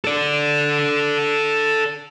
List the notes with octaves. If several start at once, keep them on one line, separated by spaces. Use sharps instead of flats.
A4 D5